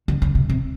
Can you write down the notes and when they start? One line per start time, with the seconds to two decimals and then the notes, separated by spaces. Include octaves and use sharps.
0.08 D3
0.22 D3
0.35 C3
0.49 C3